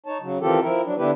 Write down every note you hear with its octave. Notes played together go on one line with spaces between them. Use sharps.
D#4 C#5 A5
C#3 F#3
D#3 E3 C4 F4 G4 A4
F3 E4 A#4
F#3 D4
D3 B3 D4 E4 G4 B4